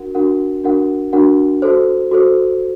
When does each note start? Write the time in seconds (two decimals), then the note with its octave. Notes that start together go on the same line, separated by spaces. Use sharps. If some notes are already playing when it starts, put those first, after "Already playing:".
Already playing: D4 F#4 A#4 F#5
0.15 D4 F#4 A#4 F#5
0.64 D4 F#4 A#4 F#5
1.13 D4 F#4 A#4 F#5
1.62 F#4 A4 C5
2.11 F#4 A4 C5